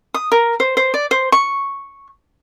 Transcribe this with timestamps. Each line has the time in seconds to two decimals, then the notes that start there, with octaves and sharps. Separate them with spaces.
0.14 D#6
0.32 A#4
0.60 C5
0.77 C5
0.94 D5
1.11 C5
1.32 C#6